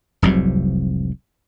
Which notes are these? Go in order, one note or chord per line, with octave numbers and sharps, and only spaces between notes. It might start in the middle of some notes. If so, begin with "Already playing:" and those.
F1 C2 G#2 F#3